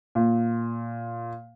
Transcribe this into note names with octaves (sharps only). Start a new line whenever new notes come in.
A#2